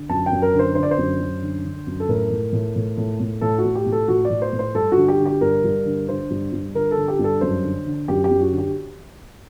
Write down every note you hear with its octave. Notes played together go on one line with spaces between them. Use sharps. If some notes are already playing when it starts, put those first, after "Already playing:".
Already playing: D3
F#2 A5
G5
F#2
A#4
D3
C5
D3 C5
D5
C5
F#2
F#2
D3
D3
F#2
A4
A2 A#4
A2
A2
A2
A2
A2
A2 A4
F#4
A2
G4
A2
A4
A2 F#4
D5
A2
C5
A2
C5
G2 A4
F#4
D3
G4
D3
G4
G2 A#4
G2
D3
D3 C5
G2
G2
D3 A#4
A4
D3
G4
G2
A4
F#2 C5
D3
D3
F#2 G4
G4
F#2
F#4
D3
G4